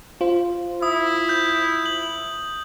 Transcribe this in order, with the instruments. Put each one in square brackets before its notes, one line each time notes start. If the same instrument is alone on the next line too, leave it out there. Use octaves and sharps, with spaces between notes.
[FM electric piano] F4 C5
[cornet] E4 [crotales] D#6
[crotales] G6
F#7